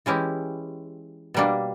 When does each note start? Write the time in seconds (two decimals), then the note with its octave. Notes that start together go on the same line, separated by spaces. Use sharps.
0.06 E3 G#3 C#4 E4 G4
1.34 B2 G3 A#3 D4